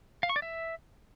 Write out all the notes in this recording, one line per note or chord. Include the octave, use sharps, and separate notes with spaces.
F5
C#6
D5
E5